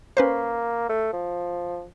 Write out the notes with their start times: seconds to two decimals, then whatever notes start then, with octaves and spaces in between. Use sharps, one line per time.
0.17 A#3 C#4 B4 C5
0.89 A3
1.13 F3